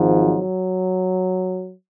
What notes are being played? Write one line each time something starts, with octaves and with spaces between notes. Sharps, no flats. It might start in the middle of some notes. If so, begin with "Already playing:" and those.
Already playing: G#1 G#2 F3
F#3